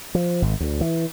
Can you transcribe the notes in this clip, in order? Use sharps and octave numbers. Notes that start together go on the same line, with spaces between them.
F3
G#1
D2
E3